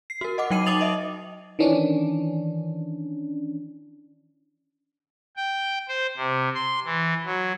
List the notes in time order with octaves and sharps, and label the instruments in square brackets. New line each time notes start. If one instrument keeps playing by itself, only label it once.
[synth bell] C7
F#4 A#4
D#5 F#5 D6
F#3 D#4 G5 C7 D#7
D#4 D6 D#6 A6 F7 F#7
D#5 E5
[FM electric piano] D#3 E3 C#4 D4
[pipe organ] G5
C5
C3
C6
E3
F#3